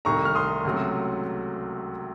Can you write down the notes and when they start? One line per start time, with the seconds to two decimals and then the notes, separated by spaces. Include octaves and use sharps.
0.05 C2 C3 D#3 A3 A#5 C#6
0.25 F6
0.35 C6 D#6
0.65 C#2 C3 F#3 A3